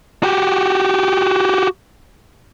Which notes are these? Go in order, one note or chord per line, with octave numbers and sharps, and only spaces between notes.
F#4 G4